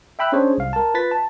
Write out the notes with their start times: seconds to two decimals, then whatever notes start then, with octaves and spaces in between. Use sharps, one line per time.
0.19 E5 G5 B5 E6 F#6
0.32 C#4 D4 G#4 C5 C#5
0.58 C2 F5
0.73 A#4 A5
0.94 F4 B4 A6 B6
1.11 A5